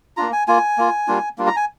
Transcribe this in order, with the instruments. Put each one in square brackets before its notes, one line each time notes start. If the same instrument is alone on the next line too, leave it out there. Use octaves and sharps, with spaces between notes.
[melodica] A#3 D4 F4 A#5
G#5
A#3 F4 G#5
A#3 F4
G3 A#3 D4 F4
G3 A#3 D4 F4
A#5
G#5